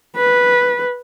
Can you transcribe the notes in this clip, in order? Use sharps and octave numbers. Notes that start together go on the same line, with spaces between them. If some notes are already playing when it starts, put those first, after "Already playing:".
B4